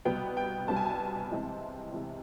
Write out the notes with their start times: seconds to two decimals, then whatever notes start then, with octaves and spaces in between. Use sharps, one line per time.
0.05 C2 B2 G3 B3 G5
0.37 G5
0.68 C2 B2 G3 B3 A5
0.76 G#5
0.85 A5
1.31 C3 E3 G#3 C4
1.92 C3 E3 G#3 C4